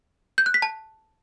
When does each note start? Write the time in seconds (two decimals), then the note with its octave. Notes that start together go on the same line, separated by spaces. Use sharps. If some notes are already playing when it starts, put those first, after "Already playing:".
0.38 G6
0.46 F#6
0.54 B6
0.62 A5